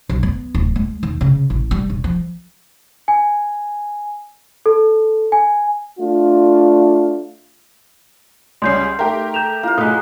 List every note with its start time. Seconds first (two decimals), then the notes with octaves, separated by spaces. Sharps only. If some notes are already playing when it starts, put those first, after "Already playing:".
0.09 B1
0.23 B3
0.54 D1
0.76 G#3
1.03 D#2
1.21 C#3
1.50 A1
1.71 G3
1.90 D#1
2.04 F3
3.08 G#5
4.66 A4
5.32 G#5
5.99 A3 D4 F4
8.62 C#2 G3 C#4 C6 G6 C7
8.99 A3 D#4 G4 A#4
9.34 A4 G6 E7 F7
9.63 A#3 D4 E4 F4 F5
9.78 A2 F#3 G#3 D#6 F#6 B6